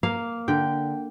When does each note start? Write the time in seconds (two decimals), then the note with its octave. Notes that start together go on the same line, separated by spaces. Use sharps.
0.03 A#3 F5
0.48 D3 G5